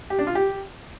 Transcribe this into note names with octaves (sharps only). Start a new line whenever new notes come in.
G4
D4
F4
G4